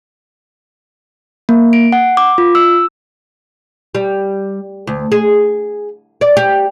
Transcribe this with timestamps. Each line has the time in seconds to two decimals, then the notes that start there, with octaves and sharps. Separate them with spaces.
1.49 A#3
1.73 D7
1.92 F#5
2.17 D6
2.38 F4
2.55 E6
3.95 G3
4.87 D2
5.12 G#4
6.21 D5
6.37 G4